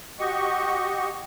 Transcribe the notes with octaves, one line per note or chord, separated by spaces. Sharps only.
F#4 G4 D#5 C#6